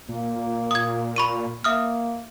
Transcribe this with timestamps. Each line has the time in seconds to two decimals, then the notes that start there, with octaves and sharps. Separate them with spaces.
0.09 A#2 A#3
0.71 D#6 G#6
1.16 B5 C#6 D#7
1.64 A#3 E5 D#6 F6